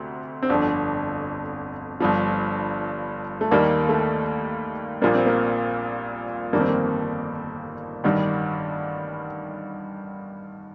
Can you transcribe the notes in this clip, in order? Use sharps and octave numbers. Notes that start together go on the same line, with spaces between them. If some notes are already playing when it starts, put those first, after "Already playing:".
Already playing: D2 C3
C4
G1 F2 D3 D4
G1 G2 F3
A3
D#2 D#3 G3 A#3
A3
A#1 A#2 G3 A#3
C4
A#3
G1 F2 D#3 G3 A#3
C4
A#3
A1 G2 D#3 G3